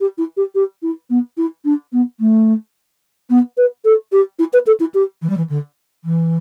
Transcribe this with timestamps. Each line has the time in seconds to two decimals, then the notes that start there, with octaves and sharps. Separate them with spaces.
0.01 G4
0.18 E4
0.37 G4
0.55 G4
0.83 E4
1.10 B3
1.38 E4
1.65 D4
1.93 B3
2.20 A3
3.30 B3
3.57 B4
3.85 A4
4.12 G4
4.39 E4
4.53 B4
4.67 A4
4.80 E4
4.95 G4
5.22 E3
5.30 G3
5.37 E3
5.50 D3
6.05 E3